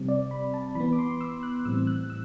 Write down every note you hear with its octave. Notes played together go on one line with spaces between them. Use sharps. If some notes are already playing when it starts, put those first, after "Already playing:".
Already playing: C3 G3 C4
D5
B5
A5
E3 B3 B5
D6
C6
E6
F#6
A2 E3 G3 C4 E6
F#6
E6